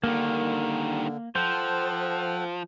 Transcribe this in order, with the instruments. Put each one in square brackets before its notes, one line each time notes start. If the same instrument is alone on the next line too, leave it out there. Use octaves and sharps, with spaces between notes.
[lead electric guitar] G2 D#3 [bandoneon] D3 [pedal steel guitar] A#3
[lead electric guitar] F3 [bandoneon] A4 F#5 G5 [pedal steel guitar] C5